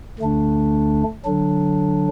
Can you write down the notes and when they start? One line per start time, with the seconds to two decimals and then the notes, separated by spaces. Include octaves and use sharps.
0.19 D2 D3 A3 D4
1.25 D3 F#3 D4